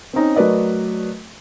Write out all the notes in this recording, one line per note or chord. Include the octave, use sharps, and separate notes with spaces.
C4 C#4 D#4
F#3 A3 A#4 B4 D5 D#5